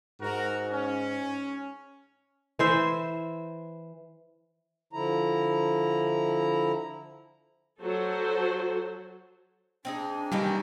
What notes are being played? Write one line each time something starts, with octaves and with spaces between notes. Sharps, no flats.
G#2 F#4 A#4
C#4
E3 C5 E5
D3 F3 E4 A#5
F#3 F#4 A4 C5
C4 D4 D#4 G#4
D#3 E3 G3 A#3 D#4